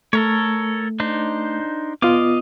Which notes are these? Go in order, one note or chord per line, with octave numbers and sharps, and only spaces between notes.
A3 A4 A#4 C#5
D4 D#4 C5
B3 F4 D#5 F5 D6